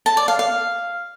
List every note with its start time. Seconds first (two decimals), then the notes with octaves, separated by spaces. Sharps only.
0.06 A5
0.17 D5
0.28 F5
0.39 F5